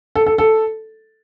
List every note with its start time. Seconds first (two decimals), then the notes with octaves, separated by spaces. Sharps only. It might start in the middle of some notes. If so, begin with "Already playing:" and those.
0.16 A4
0.26 A4
0.38 A4